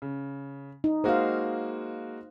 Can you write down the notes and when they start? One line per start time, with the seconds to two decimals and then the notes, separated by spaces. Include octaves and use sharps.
0.02 C#3
0.84 D#4
1.04 G#3 A#3 F#4 C5 F5